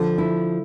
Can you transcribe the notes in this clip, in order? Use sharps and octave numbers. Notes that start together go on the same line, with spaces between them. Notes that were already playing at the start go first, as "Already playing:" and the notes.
Already playing: D3 F3
E4